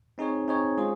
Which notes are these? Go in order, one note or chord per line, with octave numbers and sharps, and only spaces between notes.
C4 D#4 G#4 C#5
C4 D#4 G#4 C#5
G#3 C#4 F4 G#4 C5